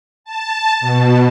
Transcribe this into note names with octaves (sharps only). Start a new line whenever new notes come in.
A5
B2